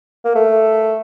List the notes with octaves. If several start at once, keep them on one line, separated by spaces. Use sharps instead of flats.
A#3
A3